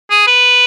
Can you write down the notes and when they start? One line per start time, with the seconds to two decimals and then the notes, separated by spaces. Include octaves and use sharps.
0.11 G#4
0.27 B4